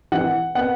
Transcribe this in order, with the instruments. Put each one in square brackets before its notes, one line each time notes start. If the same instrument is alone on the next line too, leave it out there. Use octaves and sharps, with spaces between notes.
[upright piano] E3 F#5
B3 F#5